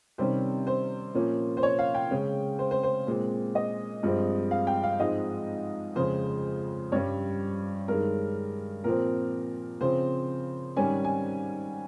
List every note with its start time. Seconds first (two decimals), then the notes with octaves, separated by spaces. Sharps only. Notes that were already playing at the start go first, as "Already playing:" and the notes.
0.18 C3 D#3 G3 C#4 C5
0.67 C5
1.14 A#2 F3 A#3 C#4
1.57 C5
1.63 C#5
1.79 F5
1.95 G5
2.11 C#3 G#3 C#4
2.59 C5
2.71 C5
2.83 C5
3.07 A#2 G#3 C4
3.55 D#5
4.03 G2 F3 G#3 C4
4.51 F5
4.67 G5
4.83 F5
4.99 G#2 F3 G#3 C4 D#5
5.96 F2 C#3 G#3 C5
6.92 G2 G3 C#4 C#5
7.88 G2 D#3 G#3 A#4
8.84 A#2 F3 C4 A#4
9.80 C#3 F3 C4 C5
10.77 G#2 D#3 G3 C#4 G#5
11.04 G#5